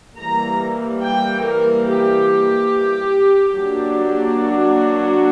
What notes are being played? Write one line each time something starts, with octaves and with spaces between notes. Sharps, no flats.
E3 G3 A#3 A#5
G5
A#4
G4
F#3 A#3 D4
F#4